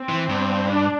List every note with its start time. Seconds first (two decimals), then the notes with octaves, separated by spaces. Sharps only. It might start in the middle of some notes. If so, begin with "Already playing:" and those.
Already playing: C4
0.09 E3
0.29 G2
0.69 D4